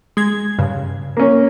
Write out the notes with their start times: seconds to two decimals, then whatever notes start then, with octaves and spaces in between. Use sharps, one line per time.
0.17 G#3 G#6
0.59 G2 C#3
1.17 A#3 C#4